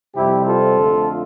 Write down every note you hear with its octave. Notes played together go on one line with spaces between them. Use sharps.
F2 C3 G3 C4 E4 G4
F4 A4
F2 D3 A3